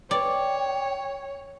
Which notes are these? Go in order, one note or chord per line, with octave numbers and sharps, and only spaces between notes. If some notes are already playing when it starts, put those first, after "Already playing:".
C#5 D5 G5